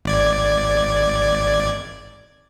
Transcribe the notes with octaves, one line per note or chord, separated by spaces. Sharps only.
G#1 D5 G#6